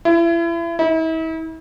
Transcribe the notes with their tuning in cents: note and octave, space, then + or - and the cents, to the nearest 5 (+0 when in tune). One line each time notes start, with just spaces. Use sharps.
E4 +35
E4 -40